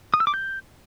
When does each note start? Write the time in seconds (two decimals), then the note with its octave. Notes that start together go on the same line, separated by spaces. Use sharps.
0.14 D#6
0.20 E6
0.27 D6
0.34 G6